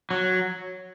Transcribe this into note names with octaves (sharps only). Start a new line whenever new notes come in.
F#3